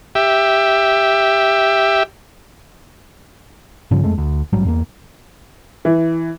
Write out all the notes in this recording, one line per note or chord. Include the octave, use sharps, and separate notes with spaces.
G4 E5
G2 C#3 F3 G3
F2 G#3 A3
D2
A1 G#2 F#3 G3
E2 A3 A#3
E3